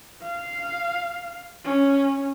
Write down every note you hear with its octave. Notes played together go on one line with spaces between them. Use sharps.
F5
C#4